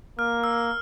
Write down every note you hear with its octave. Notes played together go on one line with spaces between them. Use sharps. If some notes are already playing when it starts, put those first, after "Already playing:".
A#3 F6
E6